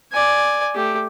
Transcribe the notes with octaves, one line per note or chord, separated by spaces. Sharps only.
D5 G#5
A3 G4